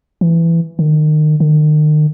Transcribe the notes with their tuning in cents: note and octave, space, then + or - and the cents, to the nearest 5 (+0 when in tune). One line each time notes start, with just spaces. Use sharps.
E3 +15
D#3 -30
D#3 -40